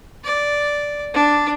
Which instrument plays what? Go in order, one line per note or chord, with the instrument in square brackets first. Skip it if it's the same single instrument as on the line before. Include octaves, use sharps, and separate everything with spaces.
[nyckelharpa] D5
D4